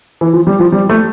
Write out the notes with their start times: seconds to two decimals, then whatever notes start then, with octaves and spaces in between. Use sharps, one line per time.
0.21 E3
0.33 F3
0.47 G3
0.60 F3
0.72 G3
0.89 A3